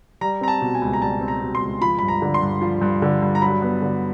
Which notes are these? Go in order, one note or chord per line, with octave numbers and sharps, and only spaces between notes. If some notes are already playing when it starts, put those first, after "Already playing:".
G3 A#5
C4 A#5
A5
B2
G#5
C#2
A#5
G3 A5
C4
A#5
B2
C6
C#2
F3 B5
G2 B5
A#5
D3
C6
G2
F3
G2
D3
G2
A#5
F#3 B5
B3
D3